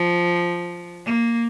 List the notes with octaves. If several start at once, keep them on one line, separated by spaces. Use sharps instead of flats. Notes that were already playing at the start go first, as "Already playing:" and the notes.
Already playing: F3
A#3